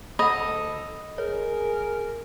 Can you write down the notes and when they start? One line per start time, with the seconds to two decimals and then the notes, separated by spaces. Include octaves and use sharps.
0.19 D2 A4 D#5 F#5 B5
1.18 G#4 A#4 C#5